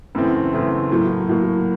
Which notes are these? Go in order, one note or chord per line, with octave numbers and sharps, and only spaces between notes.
F#2 C#3 E3 A3 C4
F#2 C#3 E3 A3 C4
A2 F#3 A#3
A2 F#3 A#3